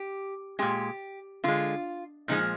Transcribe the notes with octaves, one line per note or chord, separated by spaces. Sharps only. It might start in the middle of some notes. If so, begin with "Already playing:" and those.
Already playing: G4
A#2 G#3 G4
D3 G#3 F4
A#2 F3 G#3 D#4